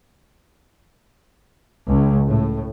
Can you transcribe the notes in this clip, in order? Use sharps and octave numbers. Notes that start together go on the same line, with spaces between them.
C#2
A2